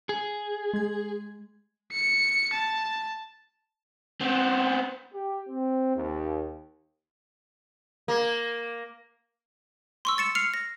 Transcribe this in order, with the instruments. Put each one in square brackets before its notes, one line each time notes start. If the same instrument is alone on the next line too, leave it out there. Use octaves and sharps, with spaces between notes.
[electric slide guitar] G#4
[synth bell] G#3 G#6
[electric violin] C#7
A5
[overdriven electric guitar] B3 C4
[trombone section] G4
C4
D#2
[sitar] A#3
[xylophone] C6 C#6 E6
A6 C#7 E7
F6 C7 C#7 F7
A#6